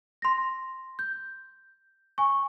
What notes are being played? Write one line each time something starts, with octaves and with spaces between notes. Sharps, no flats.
C6 A#6
G6
G#5 C#6